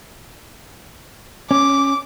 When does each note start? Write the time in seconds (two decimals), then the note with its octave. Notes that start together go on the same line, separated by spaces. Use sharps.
1.51 C#4 D6